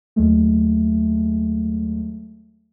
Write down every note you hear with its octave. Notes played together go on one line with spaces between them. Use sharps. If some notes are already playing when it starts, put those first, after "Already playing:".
D#2 F#3 G#3 A3